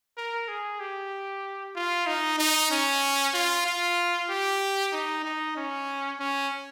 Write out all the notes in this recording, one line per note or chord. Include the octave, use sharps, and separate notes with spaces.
A#4
G#4
G4
F4
D#4
D#4
C#4
F4
F4
G4
D#4
D#4
C#4
C#4